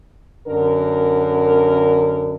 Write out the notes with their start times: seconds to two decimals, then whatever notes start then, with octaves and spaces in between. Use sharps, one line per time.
0.48 F#2 D3 A#4